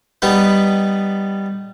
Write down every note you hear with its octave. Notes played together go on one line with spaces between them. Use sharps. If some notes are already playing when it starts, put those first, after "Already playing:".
G3 B3 D#4 B4